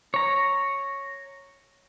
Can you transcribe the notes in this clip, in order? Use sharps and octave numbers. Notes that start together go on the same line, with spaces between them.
C#5 A#5